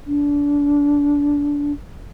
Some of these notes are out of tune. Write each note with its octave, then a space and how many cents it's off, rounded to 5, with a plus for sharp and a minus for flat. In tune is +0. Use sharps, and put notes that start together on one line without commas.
D4 -25